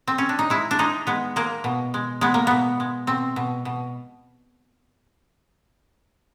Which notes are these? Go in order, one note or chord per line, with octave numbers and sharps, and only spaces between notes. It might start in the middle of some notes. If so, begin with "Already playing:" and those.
C4
C#4
D4
D#4
G#3 E4
D4
G#3 D#4
G#3 B3
G#3 A#3
B2
G#3
G#3 B3
A#3
B2 B3
G#3
B2 C4
B2
B2